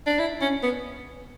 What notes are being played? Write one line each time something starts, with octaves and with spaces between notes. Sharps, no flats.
D4
E4
C#4
B3